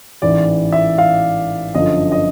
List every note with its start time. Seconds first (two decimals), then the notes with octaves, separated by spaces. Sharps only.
0.22 A1 G#2 E3 D5
0.72 E5
0.98 F5
1.74 G1 F#2 D3 F3 D#5
2.12 D#5